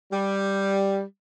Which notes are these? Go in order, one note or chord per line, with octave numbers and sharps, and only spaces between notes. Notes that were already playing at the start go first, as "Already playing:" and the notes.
G3